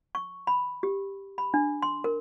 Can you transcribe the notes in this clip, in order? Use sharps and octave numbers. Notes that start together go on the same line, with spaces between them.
C#6
B5
G4
B5
D4
C6
A#4